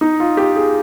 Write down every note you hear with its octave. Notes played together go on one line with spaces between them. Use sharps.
D#4
F4
G4
G#4